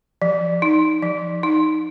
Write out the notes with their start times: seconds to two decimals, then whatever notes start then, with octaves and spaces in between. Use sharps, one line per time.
0.22 F3
0.62 D#4
1.02 F3
1.43 D#4